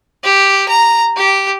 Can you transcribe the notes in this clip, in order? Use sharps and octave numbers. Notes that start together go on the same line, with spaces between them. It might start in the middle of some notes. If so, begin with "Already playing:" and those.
G4
A#5
G4